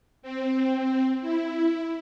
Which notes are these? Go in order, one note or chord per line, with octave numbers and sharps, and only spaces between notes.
C4
E4